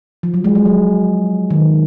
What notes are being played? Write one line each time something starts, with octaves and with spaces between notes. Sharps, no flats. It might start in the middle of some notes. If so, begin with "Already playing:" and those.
F3
F#3
G#3
G#3
F#3
D#3